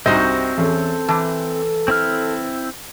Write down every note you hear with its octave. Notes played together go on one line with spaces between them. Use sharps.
C2 G2 C4 D#4 F#4 C5 D#5
E2 C#4 A4
E3 A5 D6
C4 E4 F6